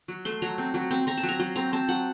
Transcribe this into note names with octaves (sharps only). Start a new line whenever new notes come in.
F#3
A3 C6
F#3 A#5
C4
F#3
C4
C4 A#5
A5
F#3
A#5
F#3 C6
C4 A#5
C4 A5
F#3 F#5